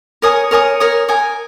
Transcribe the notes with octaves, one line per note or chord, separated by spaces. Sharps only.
A#4 C#5 G#5 D#6
A#4 C#5 G#5 D#6
A#4 C#5 G#5 D#6
A#4 C#5 G#5 D#6